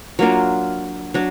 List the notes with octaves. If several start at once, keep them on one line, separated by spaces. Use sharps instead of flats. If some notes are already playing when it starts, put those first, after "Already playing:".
F#3 A#3 D4 F4
F#3 D4